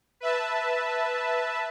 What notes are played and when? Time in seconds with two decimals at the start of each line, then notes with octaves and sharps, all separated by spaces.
0.20 B4 E5 A5